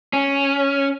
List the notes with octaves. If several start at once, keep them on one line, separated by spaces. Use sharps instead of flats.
C#4